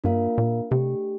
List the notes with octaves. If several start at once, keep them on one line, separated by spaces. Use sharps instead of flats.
G2 A#3 D4 F4 A#4 F5
A#2
C3 A3 D4 G4